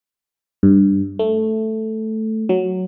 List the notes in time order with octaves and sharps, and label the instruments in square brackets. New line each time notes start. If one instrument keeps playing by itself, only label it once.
[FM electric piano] G2
A3
F#3